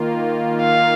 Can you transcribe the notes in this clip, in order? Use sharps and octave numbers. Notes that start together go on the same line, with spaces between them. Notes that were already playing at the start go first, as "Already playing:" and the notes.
Already playing: D#3 A#3 F4
F5